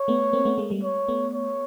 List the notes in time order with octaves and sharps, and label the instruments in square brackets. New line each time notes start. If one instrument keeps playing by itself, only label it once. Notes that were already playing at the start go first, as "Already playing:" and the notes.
Already playing: [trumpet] C#5
[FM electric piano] A3 B3
A#3 C4
A3 B3
G#3 A#3
G3 A3
[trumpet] C#5
[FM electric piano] A3 B3
[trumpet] C#5